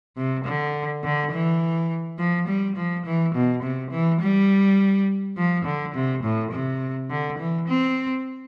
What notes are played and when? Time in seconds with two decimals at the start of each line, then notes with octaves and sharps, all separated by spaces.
0.17 C3
0.45 D3
1.04 D3
1.32 E3
2.18 F3
2.48 G3
2.77 F3
3.06 E3
3.35 B2
3.63 C3
3.92 E3
4.21 G3
5.37 F3
5.65 D3
5.94 C3
6.24 A2
6.52 C3
7.10 D3
7.39 E3
7.68 C4